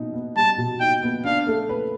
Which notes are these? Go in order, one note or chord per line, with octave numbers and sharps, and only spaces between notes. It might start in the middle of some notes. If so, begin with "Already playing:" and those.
Already playing: B2 D#4
B3
G3 A5
B2
D#4 G5
B3
D4 F5
A3
B4